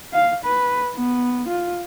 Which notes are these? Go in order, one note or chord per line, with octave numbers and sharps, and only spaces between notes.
F5
B4
B3
F4